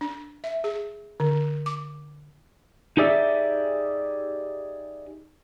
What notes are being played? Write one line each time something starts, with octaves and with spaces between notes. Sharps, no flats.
D4
E5
G#4
D3
D6
D#4 G4 G#4 D5 E5